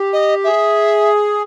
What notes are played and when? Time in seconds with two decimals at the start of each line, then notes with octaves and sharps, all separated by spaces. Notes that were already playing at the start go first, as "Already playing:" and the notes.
Already playing: G4
0.13 D#5
0.44 G#4 E5